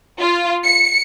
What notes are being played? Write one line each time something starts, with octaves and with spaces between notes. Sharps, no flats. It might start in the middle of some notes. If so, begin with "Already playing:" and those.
F4
C#7